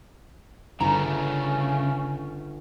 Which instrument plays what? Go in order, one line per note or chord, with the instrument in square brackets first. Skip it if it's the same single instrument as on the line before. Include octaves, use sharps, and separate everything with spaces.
[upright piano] G1 [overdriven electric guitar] C#3 A3 [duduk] C#4 [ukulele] A#5